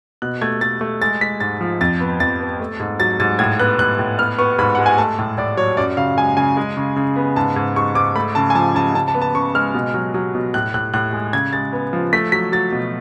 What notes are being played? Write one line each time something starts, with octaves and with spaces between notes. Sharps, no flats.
B2 F#6
A3 G#6
A3 A6
A3
G#3 A6
G#3 B6
G#2 A6
F3
F2 A6
B3
F2 A6
B3
A3
G#2
F#3 A6
G#2 A6
A2 G#6
B3 F#6
A2 F#6
A2
B3 F6
B3 C#6
G#2 B5
G#3 F#5
G#5
A3 A5
A2
A2 D5
F#3 C#5
F#2 D5
C#3 F5
G#3 G#5
C#3 G#5
G#3
C#3
C#3
B3
G#2 A5
G#2
G#2 C#6
G#2 D6
A3 B5
C#3 A5
G#5
F3 A5
C#3 A5
C#3 A5
A5
B3
A5
C#3 C#6
G#3 F6
B2
F#3
F#3
B2
A2 F#6
A2 F#6
A2 F#6
G#3
C#3 G#6
G#3 A6
B3
F3
A3 B6
F#3 B6
F#3 A6
B2